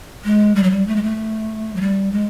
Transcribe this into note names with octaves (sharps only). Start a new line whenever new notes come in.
G#3
G3
F#3
G3
A3
G#3
A3
F#3
G3
G#3